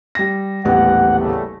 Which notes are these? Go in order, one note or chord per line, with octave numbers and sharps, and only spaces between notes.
G3 A#6
D#1 A1 B3 F#5
C#3 G3 A3